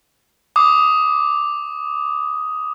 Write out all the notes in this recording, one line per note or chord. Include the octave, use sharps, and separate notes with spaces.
D6 D#6